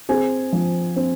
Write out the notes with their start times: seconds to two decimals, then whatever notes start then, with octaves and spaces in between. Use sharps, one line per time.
0.09 C4 G#4 G#5
0.52 F3
0.96 C4